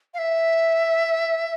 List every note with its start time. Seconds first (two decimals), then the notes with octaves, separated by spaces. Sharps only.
0.14 F5
0.19 E5